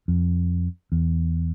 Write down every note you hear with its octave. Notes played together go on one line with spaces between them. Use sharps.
F2
E2